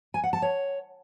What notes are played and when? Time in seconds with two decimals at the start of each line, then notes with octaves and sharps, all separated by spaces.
0.14 G#5
0.24 F#5
0.33 A5
0.42 C#5